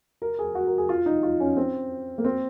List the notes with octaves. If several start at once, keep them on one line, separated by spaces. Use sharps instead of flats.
A#4
G#4
F#4
A#4
G#4
F4
D#4
F4
C#4
C4
A#3
C4